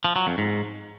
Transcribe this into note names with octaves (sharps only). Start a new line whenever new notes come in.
F3
F#3
F2
G#2